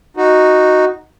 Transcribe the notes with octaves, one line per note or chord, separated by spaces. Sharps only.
D#4 F#4